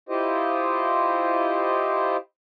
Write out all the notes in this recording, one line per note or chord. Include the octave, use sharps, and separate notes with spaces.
E4 F4 G4 C5 D#5